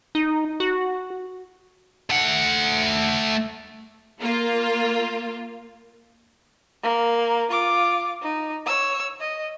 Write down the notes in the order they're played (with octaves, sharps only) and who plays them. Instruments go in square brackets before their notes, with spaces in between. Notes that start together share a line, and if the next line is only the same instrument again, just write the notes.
[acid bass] D#4
F#4
[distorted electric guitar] A3 F#5
[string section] A#3 F4
[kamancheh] A#3
F4 D6
D#4
C#5 E6
D#5